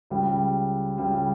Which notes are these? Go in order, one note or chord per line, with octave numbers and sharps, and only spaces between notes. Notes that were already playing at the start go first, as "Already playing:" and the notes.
C#2 C#3 G3
C#2 C#3 G3